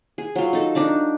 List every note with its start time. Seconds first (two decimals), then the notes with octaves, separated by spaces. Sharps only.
0.18 G#4
0.36 F#3 F4
0.53 D#4 A4
0.75 D4 D#4 D5 A5